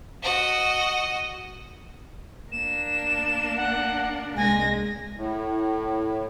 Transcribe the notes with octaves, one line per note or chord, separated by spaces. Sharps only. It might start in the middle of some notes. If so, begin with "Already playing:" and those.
F#4 D#5
A#3 D4 E7
F#5
C2 G#3 G#5 A#6
A2